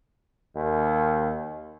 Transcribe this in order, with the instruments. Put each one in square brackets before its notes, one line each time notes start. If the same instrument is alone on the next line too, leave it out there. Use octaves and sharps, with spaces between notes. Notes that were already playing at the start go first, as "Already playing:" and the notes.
[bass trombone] D#2